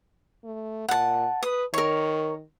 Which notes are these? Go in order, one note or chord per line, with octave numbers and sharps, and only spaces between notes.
A3
A#2 F#5 A5
B4 D#6
D#3 A#4 C#5